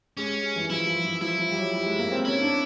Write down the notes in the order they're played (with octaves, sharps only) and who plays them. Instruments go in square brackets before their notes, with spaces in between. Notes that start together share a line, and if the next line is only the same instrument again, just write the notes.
[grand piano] G#3 [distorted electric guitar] C#4
[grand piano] G3
E3
[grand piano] F3 [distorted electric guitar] E4
[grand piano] F3
E3
[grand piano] F3 [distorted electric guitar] E4
[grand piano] F3
G3
F#3
G3
G#3
A#3
C4
[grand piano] C#4 [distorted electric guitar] E4
[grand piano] D4